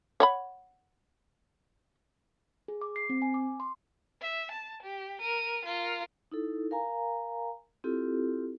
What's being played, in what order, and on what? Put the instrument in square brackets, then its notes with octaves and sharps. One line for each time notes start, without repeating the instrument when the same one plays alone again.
[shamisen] C#5 F#5 B5
[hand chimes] G#4
D6
C7
C4
G#5
D6
C6
[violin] E5
A5
G4
A#4 D#7
F4 A#4
[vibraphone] D#4 E4 A4
A#4 F5 G#5 A#5
C4 E4 F4 G4 A4